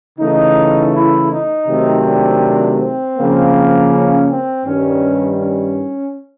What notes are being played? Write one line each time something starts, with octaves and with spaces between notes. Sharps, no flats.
C#3 E3 A3 D#4
E4
D#4
C3 D#3 F#3 A3 C4
D4
C4
C#3 F3 A#3
C#4
C4
G2 D#3 G3 C#4
C#4